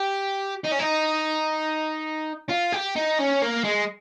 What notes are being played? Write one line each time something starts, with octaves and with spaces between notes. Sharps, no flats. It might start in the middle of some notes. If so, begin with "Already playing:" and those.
Already playing: G4
D#4
C#4
D#4
F4
G4
D#4
C#4
A#3
G#3